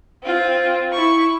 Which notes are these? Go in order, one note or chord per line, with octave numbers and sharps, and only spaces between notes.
C4 F4
E4 C#6